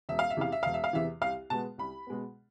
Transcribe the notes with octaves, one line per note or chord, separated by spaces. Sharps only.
E1 E5
F5
E5
E2 C3 E3 F5
E5
E1 F5
E5
F5
E2 C3 E3 E5
C2 F5
B2 G#3 B3 A5
C2 B5
B2 G#3 B3